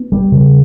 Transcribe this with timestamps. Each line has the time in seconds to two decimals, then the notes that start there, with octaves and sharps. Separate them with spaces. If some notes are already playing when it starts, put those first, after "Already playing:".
Already playing: B3
0.12 G3
0.32 C#3